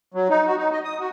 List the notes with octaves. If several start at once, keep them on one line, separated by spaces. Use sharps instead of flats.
F#3
D#4
F#4
D#4
D#5
D#6
F#4